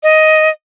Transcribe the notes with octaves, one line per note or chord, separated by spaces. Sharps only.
D#5